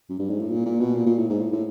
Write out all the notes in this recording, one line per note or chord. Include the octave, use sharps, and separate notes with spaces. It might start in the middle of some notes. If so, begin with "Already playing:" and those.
F#2
G2
G#2
A2
A#2
A#2
B2
A#2
A#2
A2
G#2
A2
A2